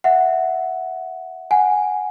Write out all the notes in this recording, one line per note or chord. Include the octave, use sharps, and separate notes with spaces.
E5 F#5
F#5 G#5